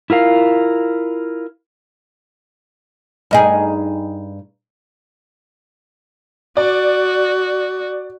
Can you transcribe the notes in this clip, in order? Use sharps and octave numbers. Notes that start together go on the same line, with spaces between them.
E4 F4 A#4 F5
G2 D#4 G#4
F#4 D5